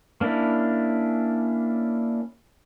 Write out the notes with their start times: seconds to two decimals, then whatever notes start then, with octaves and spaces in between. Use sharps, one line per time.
0.21 A#3 C#4 D4 E4